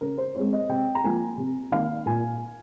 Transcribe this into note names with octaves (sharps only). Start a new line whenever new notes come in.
C#3 A#4
C5
G#3 C4 C#5
D#5
C3 G5
A#5
F3 A#3 G#5
C3
D#3 A#3 F5
A#2 G#5